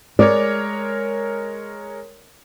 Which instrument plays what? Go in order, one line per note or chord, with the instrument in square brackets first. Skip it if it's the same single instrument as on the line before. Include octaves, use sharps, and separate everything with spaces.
[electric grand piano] G#3 A#4 C#5 [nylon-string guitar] D5